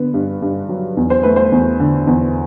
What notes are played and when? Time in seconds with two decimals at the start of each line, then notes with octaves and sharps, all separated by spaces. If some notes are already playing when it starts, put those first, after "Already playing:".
Already playing: D3 B3
0.14 G2
0.42 G2
0.69 F#3
0.97 E2
1.10 C5
1.23 A3 B4
1.36 C5
1.52 E2
1.80 D3
2.07 E2